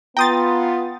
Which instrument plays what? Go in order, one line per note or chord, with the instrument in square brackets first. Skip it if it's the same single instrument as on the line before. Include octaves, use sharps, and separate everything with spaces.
[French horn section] B3 F4 [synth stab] G5 D#6 A6 [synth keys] A#5 C6